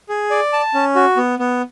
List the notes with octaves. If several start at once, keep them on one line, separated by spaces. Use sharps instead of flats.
G#4
D5
A5
C#4
F#4
B3
B3